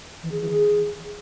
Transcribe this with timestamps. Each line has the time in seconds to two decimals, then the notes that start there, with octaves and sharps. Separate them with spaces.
0.22 E3
0.31 G#4
0.40 E3
0.49 G#4